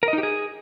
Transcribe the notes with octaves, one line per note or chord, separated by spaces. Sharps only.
A#4
D#5
D#4
G4
G#4